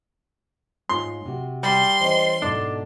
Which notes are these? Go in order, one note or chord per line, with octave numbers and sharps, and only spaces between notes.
G#2 F4 C#5 C6
C3 F#4
G3 C6
E3 C#4 C5 D#5
G#2 B2 D4 A4